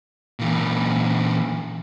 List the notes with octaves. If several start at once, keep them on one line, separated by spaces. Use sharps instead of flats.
A#2 E3